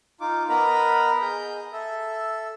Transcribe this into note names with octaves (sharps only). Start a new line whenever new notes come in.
D#4 F4 D6
B3 A#4 D#5 A#5 B5
G#4 D#5 G6
A4 E5